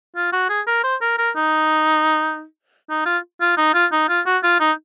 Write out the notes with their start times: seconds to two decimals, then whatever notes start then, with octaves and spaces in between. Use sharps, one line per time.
0.16 F4
0.33 F#4
0.50 G#4
0.67 A#4
0.84 C5
1.01 A#4
1.18 A#4
1.36 D#4
2.90 D#4
3.06 F4
3.41 F4
3.57 D#4
3.74 F4
3.92 D#4
4.09 F4
4.26 F#4
4.43 F4
4.60 D#4